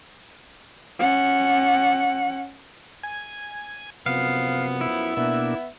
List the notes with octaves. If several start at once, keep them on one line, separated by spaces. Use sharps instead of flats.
C#4 F#5
G#5
F#2 C3 F3 B3 F5
E4
B2 A#3 B3 D4 E5